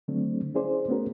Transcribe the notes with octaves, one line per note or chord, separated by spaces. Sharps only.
D3 F#3 A3 C4 D4
C#4 E4 G#4 C5 D5
A3 B3 C#4 F#4 A#4